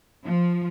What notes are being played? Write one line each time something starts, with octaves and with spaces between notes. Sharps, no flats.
F3